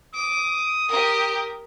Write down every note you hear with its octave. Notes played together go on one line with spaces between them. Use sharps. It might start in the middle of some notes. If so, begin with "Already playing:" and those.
D6 D#6
G4 A#4